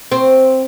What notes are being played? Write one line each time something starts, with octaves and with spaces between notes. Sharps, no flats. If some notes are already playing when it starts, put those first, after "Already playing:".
C4